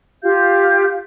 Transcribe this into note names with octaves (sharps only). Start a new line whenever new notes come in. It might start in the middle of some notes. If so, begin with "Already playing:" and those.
F4 G4 F5 G6